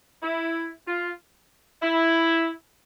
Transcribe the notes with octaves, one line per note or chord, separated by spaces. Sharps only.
E4
F4
E4